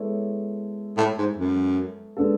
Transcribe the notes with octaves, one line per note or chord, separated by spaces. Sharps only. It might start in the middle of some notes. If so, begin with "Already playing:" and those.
Already playing: G#3 B3 E4 A4 C#5
A2
G#2
F#2
G#3 B3 D4 A4